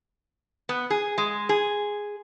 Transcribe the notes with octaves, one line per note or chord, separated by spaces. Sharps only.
B3
G#4
G#3
G#4